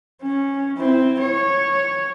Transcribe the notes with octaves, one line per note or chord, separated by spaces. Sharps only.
C#4
C4 E4
C#5